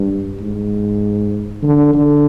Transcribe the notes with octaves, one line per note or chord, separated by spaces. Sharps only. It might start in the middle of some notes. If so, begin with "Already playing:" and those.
Already playing: G2
G#2
D3
D3